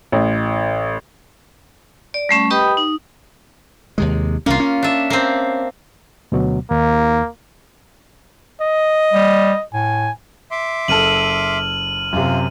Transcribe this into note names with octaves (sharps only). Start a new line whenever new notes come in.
A1
D5
G3 A3 C#4
G4 B4 D#5 G5 B5 D#6
D#4
D#2 C3 G#3
C2 A#3 C#4 F4
C#4
D4 E5
A#3 C4
D2 B2 F#3
D#2 A#3
D#5
G3
A2 G#5
E5 C6 D6
F#1 A4 F6 D#7 F#7
F#2 C3 F4